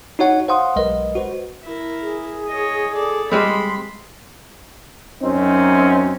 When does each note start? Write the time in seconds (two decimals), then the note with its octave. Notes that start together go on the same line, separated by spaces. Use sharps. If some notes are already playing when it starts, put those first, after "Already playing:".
0.19 D#4 F#4 C#5 F#5
0.48 C5 F5 F#5 C6 D#6
0.76 B1 G#3 A#4 B4 D#5
1.15 F#4 B4 C5
1.64 E4 A#4
2.02 G#4
2.47 C#5 D#5
2.94 A4 D5
3.31 G3 G#3 C4 B5 C6
5.23 F#2 C4 C#4 D#4